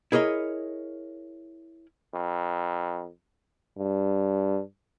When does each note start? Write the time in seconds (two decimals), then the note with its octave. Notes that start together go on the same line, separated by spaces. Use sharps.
0.12 E4 G#4 A#4 C#5 D#5
2.14 F2
3.78 G2